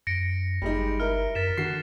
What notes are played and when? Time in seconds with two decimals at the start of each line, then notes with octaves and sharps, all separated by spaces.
0.07 F#2 A#6 C#7 D7
0.62 G1 G3 G#3 D#4
1.00 E4 A#4 F6
1.35 F#2 A#4 A6 B6 E7
1.58 D3 D#3 F#4 C7